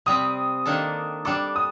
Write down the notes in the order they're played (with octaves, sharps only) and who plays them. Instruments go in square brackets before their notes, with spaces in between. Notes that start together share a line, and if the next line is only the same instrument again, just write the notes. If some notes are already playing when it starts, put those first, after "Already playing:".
[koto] C3 G3 C4 [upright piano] D#6
[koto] D#3 A#3 D4 A4
[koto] G3 D4 A4 [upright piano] D6
[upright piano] D#6